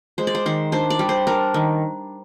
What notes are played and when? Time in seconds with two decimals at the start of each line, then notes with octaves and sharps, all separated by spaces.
0.18 G#3 C5
0.27 D5
0.35 C5
0.46 D#3 C5
0.72 D4 C5
0.90 D5
0.99 G3
1.09 C5
1.27 D4 A#4
1.54 D#3